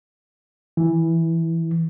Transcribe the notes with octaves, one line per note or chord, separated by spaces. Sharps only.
E3